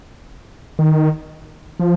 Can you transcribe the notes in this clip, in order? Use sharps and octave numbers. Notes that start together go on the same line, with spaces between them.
D#3
F3